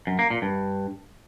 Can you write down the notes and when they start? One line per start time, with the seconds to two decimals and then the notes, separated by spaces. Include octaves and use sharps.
0.07 F#2
0.19 A#3
0.30 A#2
0.42 G2